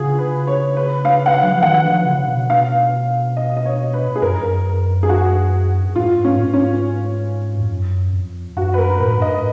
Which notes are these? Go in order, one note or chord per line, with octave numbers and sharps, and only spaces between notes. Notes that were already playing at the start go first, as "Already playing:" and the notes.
Already playing: C#3 F4 F#4 G#4
B4
C#5
B4
F5
F#5
F5
F#3
F3
D#3 F#5
F3
C#3
C#3
B2
F5
D#5
D#5
C#5
B4
G#4
F#2 A#4
F2
F#2
G#4
F#4
G#2 F4
C#4
G#2
C#4
F2
F#2
F2
F#2 F#4
B4
A#4
A#2 B4
G#2
F#2
G#2 D#5